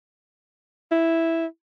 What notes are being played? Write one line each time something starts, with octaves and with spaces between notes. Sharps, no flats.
E4